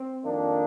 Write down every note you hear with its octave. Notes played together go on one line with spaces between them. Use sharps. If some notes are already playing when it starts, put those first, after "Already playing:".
Already playing: C4
F2 D#3 A#3 D4